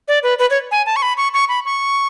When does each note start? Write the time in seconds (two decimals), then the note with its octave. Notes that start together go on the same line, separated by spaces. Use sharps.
0.08 D5
0.23 B4
0.39 B4
0.50 C#5
0.71 G#5
0.86 A5
0.96 C#6
1.02 B5
1.17 C#6
1.34 C#6
1.49 B5
1.65 C#6